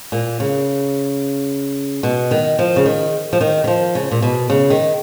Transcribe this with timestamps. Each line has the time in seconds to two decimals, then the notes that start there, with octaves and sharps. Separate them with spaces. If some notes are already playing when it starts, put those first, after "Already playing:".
0.12 A#2
0.40 C#3
2.03 B2
2.31 D#3
2.59 F3
2.76 C#3
2.86 D#3
3.33 F3
3.41 D#3
3.64 D#3
3.68 F3
3.95 C#3
4.11 A#2
4.22 B2
4.50 C#3
4.70 D#3